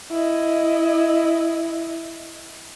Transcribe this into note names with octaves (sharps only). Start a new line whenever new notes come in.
E4 D#5